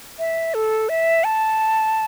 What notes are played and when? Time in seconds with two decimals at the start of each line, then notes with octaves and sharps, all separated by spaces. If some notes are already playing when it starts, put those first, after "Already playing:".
0.19 E5
0.54 A4
0.89 E5
1.24 A5